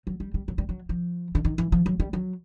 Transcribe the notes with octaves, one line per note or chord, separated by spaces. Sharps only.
F#3
G3
G3
F#3
G3
F#3
F3
D3
D#3
E3
F3
F#3
G3
F#3